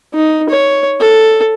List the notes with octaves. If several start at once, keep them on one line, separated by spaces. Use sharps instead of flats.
D#4
C#5
A4